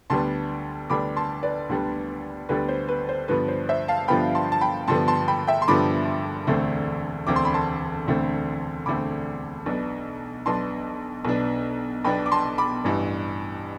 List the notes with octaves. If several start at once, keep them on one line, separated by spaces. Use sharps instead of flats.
D2 D3 G3 B3 D4 A5 C6
D2 D3 G3 B3 D4 B5 D6
A5 C6
B4 D5
D2 D3 G3 B3 D4
D2 D3 G3 B3 D4 B4
C5
B4
C5
G2 D3 F3 B3 B4
C5
C5 E5
F5 A5
G2 D3 F3 B3 G5 B5
A5 C6
A5
G5 B5
G2 D3 F3 B3 A5 C6
A5 C6
G5 B5
E5 G5
C6
G2 D3 F3 B3 B5 D6
E1 D2 D3 A3 C4
E1 D2 D3 A3 C4 D6
C6
B5
A5 C6
E1 D2 D3 A3 C4
E1 D2 D3 A3 C4 B5 D6
B1 B2 B3 D4
B1 B2 B3 D4 A5 C6
B1 B2 B3 D4
B1 B2 B3 D4 G5 B5
D6
A5 C6
B5 D6
A1 G2 E3